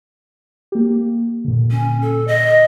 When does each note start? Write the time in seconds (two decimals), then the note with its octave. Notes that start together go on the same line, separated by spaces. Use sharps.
0.72 A#3 G4
1.44 A#2 D3
1.71 C#4
2.02 A4
2.28 D#5